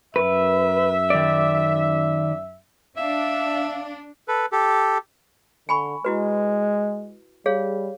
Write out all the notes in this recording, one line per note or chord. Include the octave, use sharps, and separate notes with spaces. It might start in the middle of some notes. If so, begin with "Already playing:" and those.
F#2 B4 E5
D#3 D5
D4 E5 F5
A4 B4
G4 A4
D3 G#5 B5 C#6
G#3 E4 F#4 B4
G3 G#4 C#5 F5